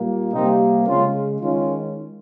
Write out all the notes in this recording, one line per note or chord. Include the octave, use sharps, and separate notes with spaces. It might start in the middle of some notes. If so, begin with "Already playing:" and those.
Already playing: A#2 G3 A#3
C3 G3 A#3 C4 D#4
C#3 G#3 C#4 F4
D#3 G#3 C#4 F4